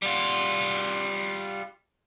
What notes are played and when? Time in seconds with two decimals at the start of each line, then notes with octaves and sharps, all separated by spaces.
0.02 G3 F4